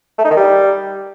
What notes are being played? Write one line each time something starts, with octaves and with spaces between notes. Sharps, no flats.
A3
D#4
D#3
G3